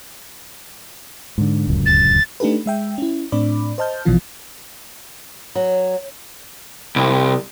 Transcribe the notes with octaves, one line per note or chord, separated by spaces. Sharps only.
G#2 D3
D1 C#2 F#2
A6
A3 D4 D#4 G4 A4 B4
G#3 E5 G5
C#4 E4
A2 C4 D4 D5 B5 D6
C5 D#5 A5 F6 G6
A#1 B2 E3 F3 F4
F#3
C2